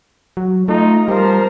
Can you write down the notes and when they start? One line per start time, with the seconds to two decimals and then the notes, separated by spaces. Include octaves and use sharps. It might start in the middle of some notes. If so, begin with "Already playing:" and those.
0.37 F#3
0.68 A3 D#4 F4
1.08 F3 G3 A#4 C5